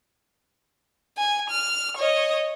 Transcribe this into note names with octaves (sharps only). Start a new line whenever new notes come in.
G#5
F6
C#5 D#5